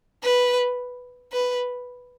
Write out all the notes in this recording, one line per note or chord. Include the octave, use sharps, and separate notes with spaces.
B4
B4